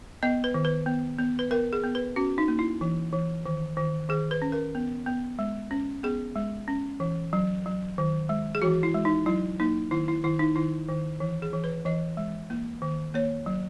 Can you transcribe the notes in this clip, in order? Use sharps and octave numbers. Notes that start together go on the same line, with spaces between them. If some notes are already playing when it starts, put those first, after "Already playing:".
B3 D#5
B4
D#3
B4
B3
B3
B4
B3 A#4
G#4
B3
B4
C#4 F#4
D#4
A#3
E4
E3
E3
D#3
D#3
D#3 G#4
B4
C#4
A#4
B3
B3
G#3
C#4
B3 G#4
G#3
C#4
E3
F#3
F#3
D#3
G#3
G#4
E3 F#4
E4
G#3
D#4
F#3 E4
A#3 D#4
D#3 E4
E4
D#3 E4
D#4
D#3 E4
D#3
E3
G#4
E3
B4
E3 D#5
G#3
A#3
D#3
A#3 C#5
F#3